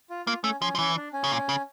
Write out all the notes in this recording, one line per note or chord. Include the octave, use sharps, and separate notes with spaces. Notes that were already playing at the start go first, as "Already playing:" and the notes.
F4
A#3 F4
A3 C#4
F3 C#4
F3
E3 C#4
D4
C#4
C#3
A#2
C#3